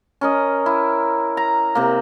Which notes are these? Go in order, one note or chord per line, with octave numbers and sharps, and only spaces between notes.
C#4 A#4 D#5
E4
A#5
C3 A#3